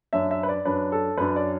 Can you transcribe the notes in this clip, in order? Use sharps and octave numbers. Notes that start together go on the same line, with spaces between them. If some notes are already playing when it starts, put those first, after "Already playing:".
F#2 F#3 D4 E5
E5
B4
D5
F#2 F#3 D4 B4
A4
F#2 F#3 D4 B4
D5